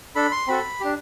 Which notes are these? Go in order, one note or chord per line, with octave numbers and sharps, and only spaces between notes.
D4 A4 B5
C6
C4 F#4 A4 B5
D4 G4